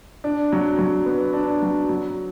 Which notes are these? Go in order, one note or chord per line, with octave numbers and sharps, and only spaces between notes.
D4
F#3
F#3
B3
D4
F#3
F#3